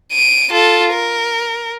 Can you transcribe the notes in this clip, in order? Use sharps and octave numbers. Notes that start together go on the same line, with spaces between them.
D7 D#7
F4 A4
A#4